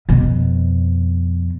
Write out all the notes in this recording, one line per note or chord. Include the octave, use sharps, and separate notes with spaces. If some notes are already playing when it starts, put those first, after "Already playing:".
F2 B2